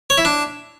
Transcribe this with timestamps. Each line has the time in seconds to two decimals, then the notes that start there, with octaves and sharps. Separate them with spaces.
0.10 C#5
0.18 E4
0.25 D4